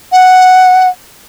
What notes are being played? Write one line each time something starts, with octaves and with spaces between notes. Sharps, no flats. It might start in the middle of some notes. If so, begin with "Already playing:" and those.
F#5